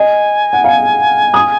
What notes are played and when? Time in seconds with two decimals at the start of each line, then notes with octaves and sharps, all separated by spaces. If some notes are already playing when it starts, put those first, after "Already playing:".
Already playing: D#5 G#5
0.53 F#5
0.64 F5
1.34 D#6